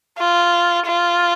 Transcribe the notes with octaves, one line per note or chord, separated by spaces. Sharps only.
F4
F4